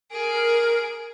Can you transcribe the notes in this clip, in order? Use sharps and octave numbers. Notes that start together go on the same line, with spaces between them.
G#4 A#4 D7